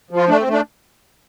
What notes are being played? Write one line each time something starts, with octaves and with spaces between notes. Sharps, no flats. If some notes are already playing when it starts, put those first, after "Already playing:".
F3
F4
A3 D4
C4
A3
D4